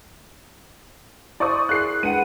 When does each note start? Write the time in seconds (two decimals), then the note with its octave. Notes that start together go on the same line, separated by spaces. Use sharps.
1.40 E4 C5 D5 C#6 D#6
1.69 E4 G#4 A#4 F#6 C7
2.03 G#3 D4 B4 F#5 D#7